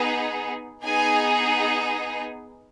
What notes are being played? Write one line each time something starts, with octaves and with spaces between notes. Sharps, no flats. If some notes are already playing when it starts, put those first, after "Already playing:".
Already playing: B3 D#4 G#4
B3 D#4 G#4 G#5